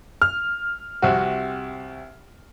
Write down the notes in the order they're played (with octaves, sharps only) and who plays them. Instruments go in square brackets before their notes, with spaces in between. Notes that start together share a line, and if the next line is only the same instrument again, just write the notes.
[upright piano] F6
[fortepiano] C2 C3 F#4